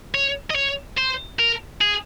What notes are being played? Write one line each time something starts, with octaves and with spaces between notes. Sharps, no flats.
C#5
D#5
C#5
C5
A#4
G#4